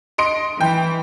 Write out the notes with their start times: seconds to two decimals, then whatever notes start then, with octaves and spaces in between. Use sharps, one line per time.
0.18 D#5 C6 D7
0.61 E3 G5